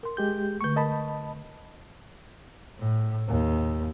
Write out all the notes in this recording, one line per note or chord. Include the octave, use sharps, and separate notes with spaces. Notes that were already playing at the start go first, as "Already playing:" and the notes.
A#4 C6
G#3 G4 G6
D3 A3 C#6 G6
A#4 D#5 A5 B5
A2
D#2